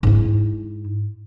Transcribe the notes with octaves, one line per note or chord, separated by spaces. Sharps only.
G#2 E4